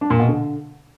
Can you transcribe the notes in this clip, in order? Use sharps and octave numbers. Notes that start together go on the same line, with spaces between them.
D4
A#2
B2
D3